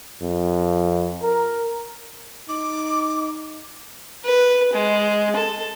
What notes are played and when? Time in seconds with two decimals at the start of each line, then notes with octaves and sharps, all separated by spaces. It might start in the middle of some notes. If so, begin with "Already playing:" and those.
0.22 F2
1.22 A#4
2.49 D#4 D6
4.25 B4
4.73 G#3
5.36 A4